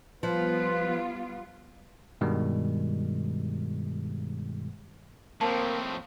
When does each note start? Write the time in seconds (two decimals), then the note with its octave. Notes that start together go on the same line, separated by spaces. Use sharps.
0.23 F3 G3 B3 F4 B4
2.21 G2 B2 D#3 G3 G#3
5.41 A2 F3 A#3 C4 A5